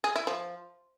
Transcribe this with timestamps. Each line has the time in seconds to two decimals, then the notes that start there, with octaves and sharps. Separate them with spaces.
0.04 G#4
0.16 E4
0.27 F3